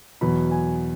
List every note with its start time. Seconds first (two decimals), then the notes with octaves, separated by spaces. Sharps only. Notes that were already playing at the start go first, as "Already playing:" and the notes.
0.21 E2 B2 F#3 B5
0.51 G#5